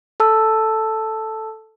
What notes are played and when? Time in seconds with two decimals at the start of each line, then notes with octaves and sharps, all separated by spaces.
0.20 A4 A5 E6